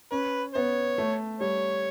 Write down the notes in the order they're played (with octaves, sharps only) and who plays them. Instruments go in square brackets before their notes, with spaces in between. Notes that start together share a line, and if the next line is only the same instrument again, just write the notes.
[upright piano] C#4 [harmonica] B4
[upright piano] B3 [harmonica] C#5
[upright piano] A3
[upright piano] G3 [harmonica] C#5